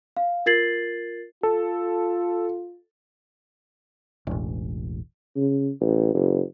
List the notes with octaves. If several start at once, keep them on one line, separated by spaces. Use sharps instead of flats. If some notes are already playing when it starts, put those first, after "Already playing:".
F5
F4 A#4 G#6 A6 C7 F#7
F4 A4
E1 A1
C#3
A1
F#1